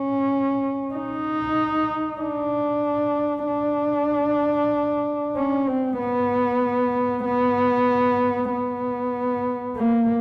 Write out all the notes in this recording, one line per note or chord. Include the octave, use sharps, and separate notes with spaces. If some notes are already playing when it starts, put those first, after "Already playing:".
Already playing: C#4
D#4
D4
D4
C#4
C4
B3
B3
B3
A#3